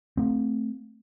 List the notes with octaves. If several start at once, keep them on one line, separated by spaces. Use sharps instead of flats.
A3 C4